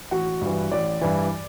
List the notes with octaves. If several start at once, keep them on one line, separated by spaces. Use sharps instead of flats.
A1 F#4 F#5
G2 E3
A1 D5
G2 E3